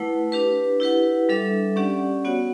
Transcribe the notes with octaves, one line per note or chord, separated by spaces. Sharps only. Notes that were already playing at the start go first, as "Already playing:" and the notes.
Already playing: A3 E4 B4 F#5
D4 G4 B4
E4 G4 B4 F#5
G3 D4 A4 E5
C#4 G4 D5 F#5
B3 F#4 C#5 F#5